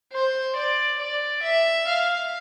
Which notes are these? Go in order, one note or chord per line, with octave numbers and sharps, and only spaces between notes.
C5
D5
D5
E5
F5